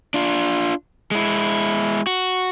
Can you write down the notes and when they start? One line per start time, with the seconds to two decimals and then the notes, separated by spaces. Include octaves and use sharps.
0.14 D4 F4
1.11 G#3 E4
2.07 F#4